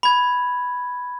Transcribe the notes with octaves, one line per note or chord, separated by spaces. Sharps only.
B5 G#6